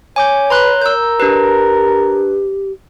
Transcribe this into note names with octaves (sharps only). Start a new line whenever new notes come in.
C#5 G#5 D6 G6
B4 A#5 C6 F#6
A#4 E6 G6
D4 G4 B4